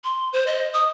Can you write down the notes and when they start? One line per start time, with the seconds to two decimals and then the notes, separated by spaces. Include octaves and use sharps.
0.04 C6
0.33 C5
0.47 D#5
0.74 D#6